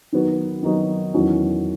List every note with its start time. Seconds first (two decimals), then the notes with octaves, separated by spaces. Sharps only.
0.12 D#3 F#3 B3 D#4 F#4
0.63 D#3 F#3 B3 D#4 F#4
1.14 E2 D#3 F#3 C#4 F#4